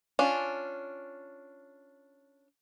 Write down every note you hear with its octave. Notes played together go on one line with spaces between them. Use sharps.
C#4 D4 F4